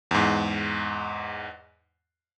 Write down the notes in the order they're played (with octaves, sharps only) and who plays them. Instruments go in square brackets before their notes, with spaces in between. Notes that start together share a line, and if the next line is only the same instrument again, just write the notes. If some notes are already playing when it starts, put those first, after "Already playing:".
[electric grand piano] E2 G#2